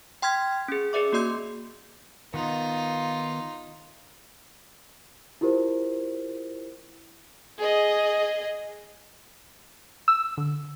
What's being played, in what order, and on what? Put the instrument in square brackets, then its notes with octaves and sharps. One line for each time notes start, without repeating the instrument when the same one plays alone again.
[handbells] G5 C6 F6 G#6 B6
C#4 G#4
G#4 B4 D5 E5 D6
A#3 F#4 D5 C6 G6
[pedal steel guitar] D#3 B3 [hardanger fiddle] D#4 F4
[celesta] E4 F4 G4 A#4 C5
[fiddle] G#4 D#5
[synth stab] E6
D3